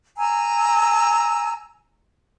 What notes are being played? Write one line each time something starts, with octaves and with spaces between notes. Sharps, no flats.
G#5 A#5 E6